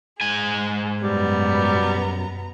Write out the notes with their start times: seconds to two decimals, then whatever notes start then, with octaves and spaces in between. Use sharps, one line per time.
0.21 G#2 G#4 G#5
1.02 F#2 B2 G3 B3 A#5